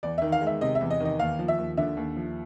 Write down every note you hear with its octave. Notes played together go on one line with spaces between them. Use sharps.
E2 D5
D#3 E5
F5
G#3
E5
C3 D#5
E5
E2
D#5
D#3 D#5
D#2 F5
F3
E5
D#2
D3 E5
D#2
F3